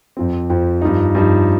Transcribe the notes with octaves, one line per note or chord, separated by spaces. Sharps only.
F2 F3 C4
F2 F3 C4
G2 F3 D#4
G2 F3 D#4